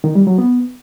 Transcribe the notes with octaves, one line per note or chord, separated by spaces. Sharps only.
D#3
G3
F#3
B3